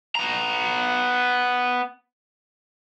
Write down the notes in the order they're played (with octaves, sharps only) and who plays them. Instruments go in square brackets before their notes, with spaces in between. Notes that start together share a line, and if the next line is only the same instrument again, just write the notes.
[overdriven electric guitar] B3 A#5